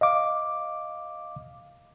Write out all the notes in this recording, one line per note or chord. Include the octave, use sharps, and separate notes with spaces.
D#5 F5 D6